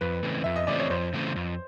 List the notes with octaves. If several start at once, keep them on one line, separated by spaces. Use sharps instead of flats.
F2 B4
C#3 E3 A3 C4
F2 E5
D#5
C#3 E3 A3 C4 D5
C#5
F2 C5
C#3 E3 A3 C4
F2